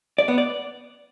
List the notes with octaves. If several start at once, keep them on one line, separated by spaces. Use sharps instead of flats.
D5
B3
D5